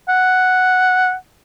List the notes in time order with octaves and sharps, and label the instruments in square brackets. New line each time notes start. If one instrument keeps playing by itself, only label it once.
[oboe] F#5